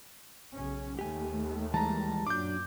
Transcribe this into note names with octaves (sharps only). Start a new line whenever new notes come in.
B1 C#3 C#4
D#2 D#3 A3 G4 G#5
E3 G3 G#3 A5 A#5
F#2 A#2 F#3 D4 D6 G6